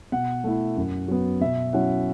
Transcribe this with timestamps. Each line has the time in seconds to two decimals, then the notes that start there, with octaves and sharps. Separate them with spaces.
0.12 B2 F#5
0.44 A3 E4
0.76 F#2
1.08 F#3 B3
1.41 B2 E5
1.73 F#3 C#4 E4 F#5